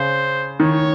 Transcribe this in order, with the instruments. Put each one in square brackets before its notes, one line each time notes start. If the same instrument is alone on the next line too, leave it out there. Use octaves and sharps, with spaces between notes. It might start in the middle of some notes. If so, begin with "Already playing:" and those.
Already playing: [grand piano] C#3 [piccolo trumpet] C5
[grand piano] D#3 [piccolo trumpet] C#5